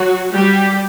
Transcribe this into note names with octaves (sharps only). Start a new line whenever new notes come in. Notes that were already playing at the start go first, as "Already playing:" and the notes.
Already playing: F#3 F#4
G3 G4